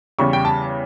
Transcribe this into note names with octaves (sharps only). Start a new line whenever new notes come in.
E2 C#3 G3 C#6
G5
A5